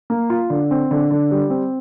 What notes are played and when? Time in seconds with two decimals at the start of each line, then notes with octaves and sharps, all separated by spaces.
0.10 A#3
0.30 F4
0.50 D3
0.71 C4
0.91 D3
1.11 D3
1.31 G3
1.50 C4